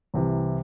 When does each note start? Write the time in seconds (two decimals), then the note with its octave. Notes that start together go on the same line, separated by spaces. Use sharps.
0.14 C2 C3 E3